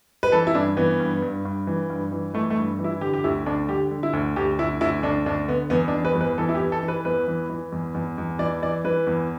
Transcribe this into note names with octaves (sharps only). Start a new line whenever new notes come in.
B4
E3 A4
E4
G2 D4
E3 B3
G2
G2
G2
E3
G2
E3
E3 A3
A3
G2
E3
E4
D3 G4
G4
D2 E4
D2 D4
D3 G4
D3
E4
D2
D2 G4
D2 E4
D2 E4
D2 D4
D2 D4
D3 B3
E2 B3
D4
E3
B4
E2
B4
E3 A4
E4
G4
E3
A4
E3
B4
E2 B4
E3
E3
E2
E2
E2
E3 D5
E3 D5
E3 B4
E2